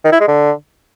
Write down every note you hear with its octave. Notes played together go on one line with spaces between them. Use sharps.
D#3
E4
G#3
D3